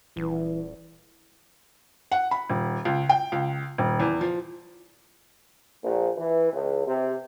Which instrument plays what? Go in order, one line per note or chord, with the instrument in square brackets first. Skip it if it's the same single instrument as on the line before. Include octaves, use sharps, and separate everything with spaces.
[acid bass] D#1 [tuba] E3
[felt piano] F#5
B5
D#1
C#2
G5
C#2
D#1
E2
F3
[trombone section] A#1
E3
C#2
C3